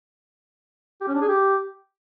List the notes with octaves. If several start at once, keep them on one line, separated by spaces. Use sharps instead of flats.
G4
C#4
D4
G#4
G4